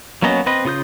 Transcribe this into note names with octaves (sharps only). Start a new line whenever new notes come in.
F#3 A#3 B3 C#4 D#5
C4 B4 D#5
C#3 F4 D#6 G6